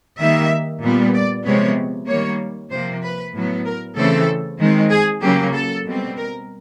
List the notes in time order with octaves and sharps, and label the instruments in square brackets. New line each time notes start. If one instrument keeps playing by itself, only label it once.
[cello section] D#3 G3 A#3 E5
A#2 G3 B3
D5
C3 F3 G#3 B3 C#5
D#3 G3 A#3 C#5
C3 F3 A#3 C5
B4
A2 F#3 B3
A#4
C#3 E3 A3 C4 A4
D#3 G#3 C4
G#4
C#3 F#3 A#3 G4
A4
B2 G3 C4
A#4